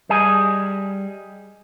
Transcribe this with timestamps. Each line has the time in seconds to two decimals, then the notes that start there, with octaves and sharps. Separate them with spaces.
0.09 G3 G#4 D#5 G#5